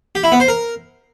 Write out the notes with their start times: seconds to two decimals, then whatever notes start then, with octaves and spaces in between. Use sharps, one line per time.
0.15 G4
0.24 E4
0.32 B3
0.40 C5
0.48 A#4